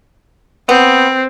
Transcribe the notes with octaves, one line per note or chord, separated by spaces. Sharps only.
B3 C4